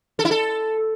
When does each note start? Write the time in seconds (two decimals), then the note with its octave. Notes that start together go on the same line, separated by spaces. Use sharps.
0.19 A4
0.25 E4
0.31 A4